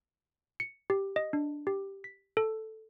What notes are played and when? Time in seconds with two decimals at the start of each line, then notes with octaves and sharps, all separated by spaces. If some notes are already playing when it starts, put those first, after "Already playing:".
0.60 C#7
0.90 G4
1.16 D#5
1.33 D4
1.67 G4
2.04 B6
2.37 A4